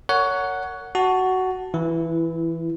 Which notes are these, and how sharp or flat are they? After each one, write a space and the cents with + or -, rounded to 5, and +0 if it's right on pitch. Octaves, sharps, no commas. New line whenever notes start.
A#4 -25 C#5 +20 F#5 +0
F#4 +10 A5 +0
E3 +0 E4 +20